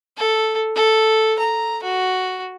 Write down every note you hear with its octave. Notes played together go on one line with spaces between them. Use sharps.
A4
A4
A#5
F#4